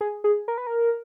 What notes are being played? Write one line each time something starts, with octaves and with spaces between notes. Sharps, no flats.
G#4
G#4
A#4
B4
A#4